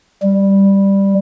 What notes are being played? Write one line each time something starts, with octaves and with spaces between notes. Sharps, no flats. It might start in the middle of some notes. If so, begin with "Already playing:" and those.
G3